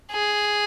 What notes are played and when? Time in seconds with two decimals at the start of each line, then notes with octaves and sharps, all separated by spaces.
0.12 G#4